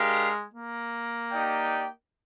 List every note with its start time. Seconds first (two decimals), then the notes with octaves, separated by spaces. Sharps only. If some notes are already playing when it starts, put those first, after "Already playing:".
Already playing: G#3 D4 G4 A#4 F5
0.54 A#3
1.31 D#4 G4 D5 G5